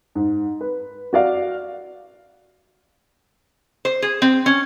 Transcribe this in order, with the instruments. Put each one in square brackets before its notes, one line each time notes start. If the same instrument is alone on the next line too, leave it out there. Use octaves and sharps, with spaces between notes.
[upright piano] G#2
B4
F#4 D5 F5
[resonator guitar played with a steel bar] C5
G#4
C4
C#4